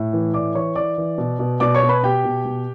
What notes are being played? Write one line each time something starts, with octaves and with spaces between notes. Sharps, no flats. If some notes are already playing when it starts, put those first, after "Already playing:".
Already playing: A2
E3
A2 D5 D6
E3 C#5 C#6
E3 D5 D6
E3
B2
B2
B2 D5 D6
C#5 C#6
B2
B4 B5
B2 G4 G5
B2
B2